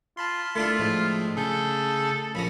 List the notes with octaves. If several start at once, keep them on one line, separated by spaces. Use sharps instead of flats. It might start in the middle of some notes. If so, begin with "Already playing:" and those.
F4 A5 B5 C6
A3 D4 E4 F4
A2 F3 G#3
C#3 G#4 A4 G6
A#1 F3 C#4 B5 A#6